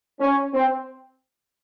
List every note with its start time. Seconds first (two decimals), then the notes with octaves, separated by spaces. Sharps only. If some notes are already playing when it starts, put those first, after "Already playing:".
0.20 C#4
0.53 C4